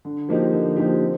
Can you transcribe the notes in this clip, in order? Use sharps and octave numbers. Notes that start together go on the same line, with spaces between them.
D3
F3 A#3 D#4 G4
D3
F3 A#3 D#4 G4
C4